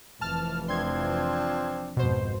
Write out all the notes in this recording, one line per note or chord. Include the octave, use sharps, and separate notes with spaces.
F1 F2 E3 A5 F6
F3 C4 D4 C6 G#6
G#1 F2 B2 C5